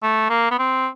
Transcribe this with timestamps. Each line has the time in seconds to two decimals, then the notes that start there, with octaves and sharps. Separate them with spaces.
0.03 A3
0.30 A#3
0.51 B3
0.59 C4